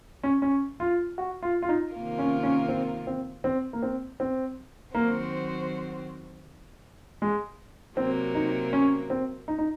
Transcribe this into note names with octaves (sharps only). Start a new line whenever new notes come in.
C#4
C#4
F4
F#4
F4
F4
D#4
C3 D#3 A#3 F4 A#4
C#4
C#4
C4
C4
C4
A#3
C4
C4
D#3 F#3 A#3 C4 F#4 C5
G#3
C3 F#3 A#3 C4
D#4
C#4
C4
D#4
D#4